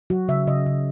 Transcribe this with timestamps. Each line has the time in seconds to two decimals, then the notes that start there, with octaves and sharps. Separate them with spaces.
0.10 F#3 F#4
0.28 C#3 E5
0.47 C#3 D#5
0.66 C#3